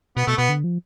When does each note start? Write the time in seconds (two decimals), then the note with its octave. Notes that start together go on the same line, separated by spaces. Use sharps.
0.17 B2 B3
0.27 B2 A3
0.37 B2 B3
0.49 D3
0.64 F3